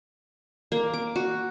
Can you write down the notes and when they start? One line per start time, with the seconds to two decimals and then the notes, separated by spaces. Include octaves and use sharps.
0.72 A#3
0.93 D6
1.16 F#4